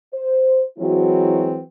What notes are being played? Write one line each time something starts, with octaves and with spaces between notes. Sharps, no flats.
C5
E3 F#3 G#3 C4 E4 F#4